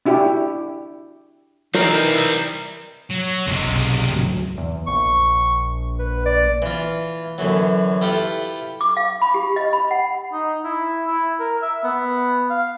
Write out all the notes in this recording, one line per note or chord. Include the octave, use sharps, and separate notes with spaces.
D4 E4 F#4 G4
E3 G3 C4 D#4 A#4
F#3
F#1 F#2 C3 G#3
B1
D2 G#2 F#3
E2
A#1 C#6
B4
D5
E3 F4
F#2 D3 E3 F#3
E4 F4 G4 A4 B4
D6
F5
B5
G4
D#5
B5
F#5
D#4
E4
E4
A#4
E5
B3
F5